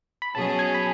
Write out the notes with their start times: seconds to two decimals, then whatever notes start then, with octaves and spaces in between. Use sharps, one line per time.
0.22 B5
0.35 B2 F#3 C#4 G#4 A5
0.59 G#5
0.74 B5